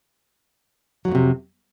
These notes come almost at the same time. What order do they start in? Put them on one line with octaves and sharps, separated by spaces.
F#3 F2 A2 C3